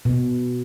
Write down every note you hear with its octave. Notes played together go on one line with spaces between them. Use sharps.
B2